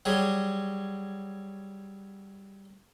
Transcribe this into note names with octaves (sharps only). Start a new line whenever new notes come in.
F#3 G3 G#4